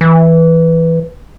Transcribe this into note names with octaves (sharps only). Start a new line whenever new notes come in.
E3